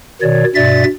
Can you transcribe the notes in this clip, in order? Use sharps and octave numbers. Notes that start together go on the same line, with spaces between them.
B2 D#3 C#5 D5
G2 B2 D5 E5 A6